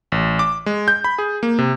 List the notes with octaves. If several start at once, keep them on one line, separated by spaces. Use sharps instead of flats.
A1
D6
G#3
G6
B5
G#4
A#3
C3